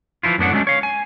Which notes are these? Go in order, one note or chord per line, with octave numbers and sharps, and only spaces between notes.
E3 F3 E4 F4
F#2 A2 B3 D4 F#5
F#3 G#3 A3 C#4 D4
C#5 F5
G#5